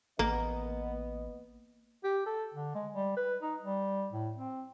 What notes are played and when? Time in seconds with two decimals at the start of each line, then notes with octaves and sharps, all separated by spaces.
0.19 A1 A#3 B3 D#5
2.04 G4
2.26 A4
2.54 D3
2.75 G#3
2.94 G3
3.17 B4
3.42 D#4
3.63 G3
4.13 A2
4.36 C4